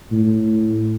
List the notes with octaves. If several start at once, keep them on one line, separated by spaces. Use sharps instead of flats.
A2